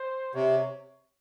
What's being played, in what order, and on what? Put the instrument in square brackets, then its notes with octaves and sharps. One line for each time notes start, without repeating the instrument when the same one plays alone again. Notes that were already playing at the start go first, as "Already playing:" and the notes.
Already playing: [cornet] C5
[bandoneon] C3 [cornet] C#5